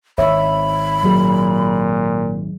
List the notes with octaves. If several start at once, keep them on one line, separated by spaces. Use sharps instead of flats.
G#1 C#5 E5 B5
A#2 F#3 G#4